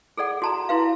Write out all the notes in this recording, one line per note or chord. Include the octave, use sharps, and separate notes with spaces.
G#4 A4 D5 F#5
F#4 A5 A#5
E4 F#4 B4 F5